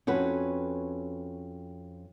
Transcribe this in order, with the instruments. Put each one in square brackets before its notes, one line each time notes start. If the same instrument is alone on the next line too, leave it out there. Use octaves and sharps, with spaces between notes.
[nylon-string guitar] F2 C#4 F#4 B4